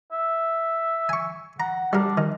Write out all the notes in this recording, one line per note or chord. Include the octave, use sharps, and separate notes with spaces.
E5
G#5 C#6
F#5 A#5
G3 D4 A#4
D#3